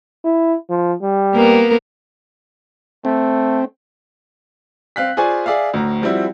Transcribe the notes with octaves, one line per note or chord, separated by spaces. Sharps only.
E4
F3
G3
A#3 B3 A#4
A3 C4
C4 F5 F#6 B6
F4 G#4 C5 D5 G#5 C#6
G#4 D5 E5 F5
D2 A2 A#5
F3 G3 C4 E4 F#4